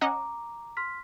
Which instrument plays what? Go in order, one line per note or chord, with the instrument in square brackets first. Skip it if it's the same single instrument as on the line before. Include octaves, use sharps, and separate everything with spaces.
[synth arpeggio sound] C#4 D#5 F#5 [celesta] A#5 D6
[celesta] C6 F6 B6